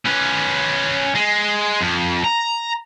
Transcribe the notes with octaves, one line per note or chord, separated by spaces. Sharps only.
C#4 B4
G#3
F2
A#5